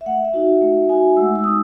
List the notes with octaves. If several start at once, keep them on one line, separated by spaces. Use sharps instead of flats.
E5
A3 F#5
E5
D#4 F#4
A3
D#4 F#4 G#5
G#3 E6
E6
B3 D#4 D#6